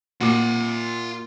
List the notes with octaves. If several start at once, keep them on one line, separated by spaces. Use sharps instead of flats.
A#2 F4 F#5 D6